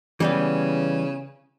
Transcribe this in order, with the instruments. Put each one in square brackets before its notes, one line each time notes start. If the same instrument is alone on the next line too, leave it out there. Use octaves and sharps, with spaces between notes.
[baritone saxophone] C#3 [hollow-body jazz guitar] E3 G3 B3